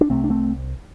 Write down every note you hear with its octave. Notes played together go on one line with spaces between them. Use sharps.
D4
C2 C3 A3 C4
D4
A3 C4